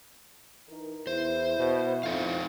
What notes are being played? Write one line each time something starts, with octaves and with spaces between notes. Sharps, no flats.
E3 D#4 A#4
E2 E4 C5
B2
F2 C4 D#4 F5